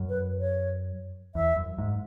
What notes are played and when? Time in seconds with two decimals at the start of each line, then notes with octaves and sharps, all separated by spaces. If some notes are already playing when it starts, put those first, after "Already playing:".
Already playing: F#2
0.09 B4
0.40 C#5
1.35 E2 E5
1.56 F#2
1.78 G#2